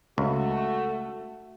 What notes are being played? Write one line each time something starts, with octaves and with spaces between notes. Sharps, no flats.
C#2 A3 F#4